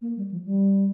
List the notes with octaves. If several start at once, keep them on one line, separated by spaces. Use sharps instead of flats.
A#3
G3
F3
G3